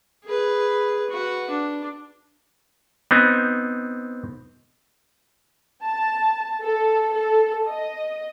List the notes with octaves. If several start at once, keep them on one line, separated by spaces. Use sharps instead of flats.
G#4 B4
F#4 B4
D4
B3 C4 D#4
A5
A4
A4
D#5